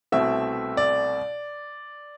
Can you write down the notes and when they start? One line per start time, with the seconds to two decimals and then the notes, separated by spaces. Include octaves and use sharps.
0.12 C2 B2 A3 C4 E5
0.77 D5